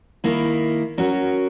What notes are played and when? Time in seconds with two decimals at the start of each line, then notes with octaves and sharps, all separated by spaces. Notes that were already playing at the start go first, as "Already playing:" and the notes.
0.24 D#3 A#3 E4
0.98 F#3 C#4 F#4 A#4